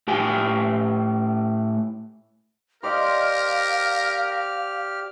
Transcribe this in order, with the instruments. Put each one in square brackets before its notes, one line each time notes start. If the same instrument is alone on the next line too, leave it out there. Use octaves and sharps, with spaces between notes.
[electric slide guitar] A2 G4 G5 G#5
[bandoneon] G4 F6 [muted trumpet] A#4 [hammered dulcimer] C5 D5 D#5 [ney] F5